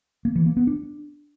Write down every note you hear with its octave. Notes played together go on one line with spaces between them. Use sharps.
A#3
E3
A#3
B3
D4